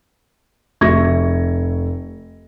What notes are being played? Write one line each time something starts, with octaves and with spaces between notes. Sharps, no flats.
F1 E5 C#6 G#6 A#6